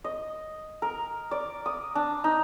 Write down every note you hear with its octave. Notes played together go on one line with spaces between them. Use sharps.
D#5
A#4
D5
D#6
D4
D#4